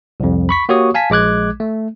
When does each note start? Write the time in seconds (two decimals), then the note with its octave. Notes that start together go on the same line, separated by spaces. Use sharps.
0.20 C2 F2
0.49 B5 C#6 B6
0.69 A#3 F#4 G4 C#5 C#6 D#6
0.94 F5 G#5 A5 B6
1.10 A#1 G#3 D6 F#6 G#6
1.60 A3